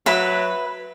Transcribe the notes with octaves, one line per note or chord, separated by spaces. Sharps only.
F#3 B4 E5 B5